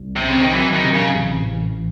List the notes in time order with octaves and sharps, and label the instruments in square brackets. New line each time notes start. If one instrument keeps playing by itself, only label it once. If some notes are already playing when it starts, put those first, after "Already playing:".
Already playing: [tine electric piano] C2
[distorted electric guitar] C3 [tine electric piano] C4
[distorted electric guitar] C#3
D#3
[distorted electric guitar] E3 [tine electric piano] F#3
[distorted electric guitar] D#3
[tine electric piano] C3
[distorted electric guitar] C#3
[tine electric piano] A1
A1